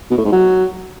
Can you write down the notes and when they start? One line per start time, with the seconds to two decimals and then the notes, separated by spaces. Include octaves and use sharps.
0.11 B2
0.18 A2
0.25 G#2
0.32 F#3